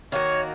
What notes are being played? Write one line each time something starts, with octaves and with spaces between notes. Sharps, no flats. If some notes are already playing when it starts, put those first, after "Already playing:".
D#3 A#3 F#4 C#5